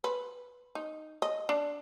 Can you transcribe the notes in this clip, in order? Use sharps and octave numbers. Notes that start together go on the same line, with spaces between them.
B4
D#4
D#5
D4